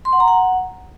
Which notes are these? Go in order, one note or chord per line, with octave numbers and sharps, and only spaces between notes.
C6
F#5
A#5
F#5